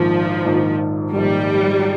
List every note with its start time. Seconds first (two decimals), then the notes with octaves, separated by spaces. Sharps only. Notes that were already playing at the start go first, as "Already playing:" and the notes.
Already playing: A#1 G#2 D#3 F3
0.45 A#1 G#2 D#3
1.15 A#1 G#2 D#3 G3